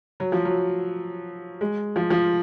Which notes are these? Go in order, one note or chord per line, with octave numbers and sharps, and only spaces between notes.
F#3
F3
F#3
G#3
F3
F3